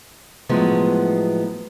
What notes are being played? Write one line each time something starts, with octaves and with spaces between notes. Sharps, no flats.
A2 F3 F#3 G#3 B3